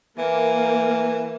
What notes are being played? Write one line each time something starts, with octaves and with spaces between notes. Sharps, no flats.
E3 A#3